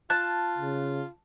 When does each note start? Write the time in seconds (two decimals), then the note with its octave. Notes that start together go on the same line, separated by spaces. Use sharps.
0.10 F4 A5 F#6
0.58 C#3